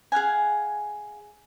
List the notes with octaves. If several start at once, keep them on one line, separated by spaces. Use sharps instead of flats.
G#4 F5 F#5 G#5